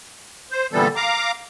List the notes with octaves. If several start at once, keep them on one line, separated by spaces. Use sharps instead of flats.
C5
A#2 D3 E3 G3 B3 A4
F5 A#5 D6